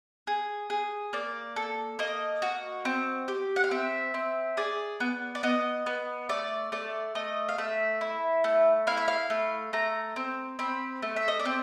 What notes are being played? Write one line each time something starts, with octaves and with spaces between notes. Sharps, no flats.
G#4
G#4
A#3 D5
A4
A#3 D#5
F#4
C4
G4
F#5
F5
C4 E5
C4
G#4 D5
B3
D5
B3 D#5
B3
A3 D5
A3 D5
A3 D#5
F5
A3 E5
E4
A3
E4 F5
E5
F5
A3
A3 A#5
C4
C4 B5
A3
E5
D#5
D5
C4